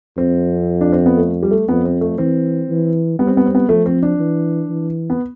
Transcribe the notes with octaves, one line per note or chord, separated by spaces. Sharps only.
F2 C4
D4
C4
B3
A3
G3
A3
F2 B3
C4
A3
E3 C4
E3
G3 B3
C4
B3
C4
B3
F3 A3
C4
D4
E3
E3
B3